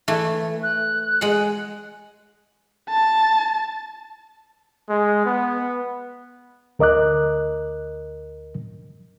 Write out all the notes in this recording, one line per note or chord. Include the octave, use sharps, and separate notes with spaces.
E3 A3
F#6
G#3 F#5
A5
G#3
B3
D2 A#4 D#5 D6 F#6